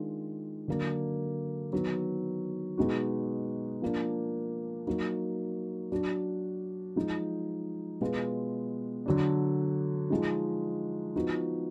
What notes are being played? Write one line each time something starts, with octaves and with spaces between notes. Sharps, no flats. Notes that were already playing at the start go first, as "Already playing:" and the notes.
Already playing: D#3 G#3 D4 F4
D3 F#3 A#3 D4
D#3 F#3 B3
B2 G#3 D#4 F#4
F3 A#3 D4
F#3 A#3 D#4 F#4
F#3 D4 F#4
F3 G#3 D#4
B2 G#3 B3 F4
D3 F#3 D4
F3 G#3 D#4
F3 B3 D#4 F#4